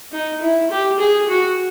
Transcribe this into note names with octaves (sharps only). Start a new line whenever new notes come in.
D#4
E4
G4
G#4
F#4